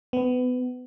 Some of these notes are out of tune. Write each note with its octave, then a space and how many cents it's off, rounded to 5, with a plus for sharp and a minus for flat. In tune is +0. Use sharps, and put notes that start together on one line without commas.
B3 +25